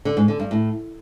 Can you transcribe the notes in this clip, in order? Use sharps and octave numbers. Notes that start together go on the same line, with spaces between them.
D3
G#2
D3
G2
A2